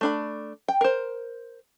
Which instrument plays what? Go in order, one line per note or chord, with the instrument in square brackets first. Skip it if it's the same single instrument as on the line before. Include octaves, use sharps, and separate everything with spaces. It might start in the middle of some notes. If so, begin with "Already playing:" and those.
[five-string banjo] A3 D4 B5
G5
A#4 C5